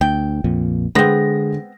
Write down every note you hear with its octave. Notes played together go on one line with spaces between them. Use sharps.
D2 G5
A#1 F2 A#2
D3 G#3 B3 C4 A#6